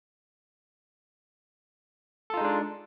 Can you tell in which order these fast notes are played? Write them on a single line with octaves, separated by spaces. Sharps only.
A4 F4 D#4 G#3 D4